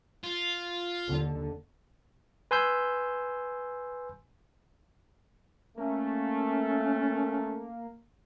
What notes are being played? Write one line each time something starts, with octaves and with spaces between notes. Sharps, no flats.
F4
D#2 D3
B4 G#5 C6 E6 G6
A3 A#3 C#4